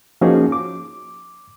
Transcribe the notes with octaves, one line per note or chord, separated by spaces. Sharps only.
F3 A#3 C#4 D#4 F#4 G#4
D6